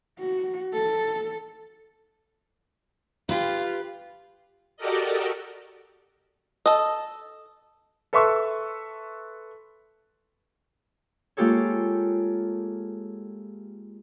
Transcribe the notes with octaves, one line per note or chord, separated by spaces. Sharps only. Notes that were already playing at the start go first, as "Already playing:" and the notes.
F#4
A4
F4 G4 B4
F#4 G4 A4 A#4 D5 D#5
A4 D#5
A4 B4 E5 C6 C#6 E6
G#3 A#3 F4 G4 A4 C#5